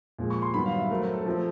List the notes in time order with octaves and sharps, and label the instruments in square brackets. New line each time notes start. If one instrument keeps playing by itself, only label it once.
[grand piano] A#2 F3 G#3
[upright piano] C#6
C6
[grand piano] G2 D#3 F#3 B3 [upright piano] B5
[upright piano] F5
E5
[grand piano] F#3 A3 C4 [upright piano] A#4
[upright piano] A#4
A4
[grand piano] F3 A3 C4